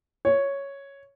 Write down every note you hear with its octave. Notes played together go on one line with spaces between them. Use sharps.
C#5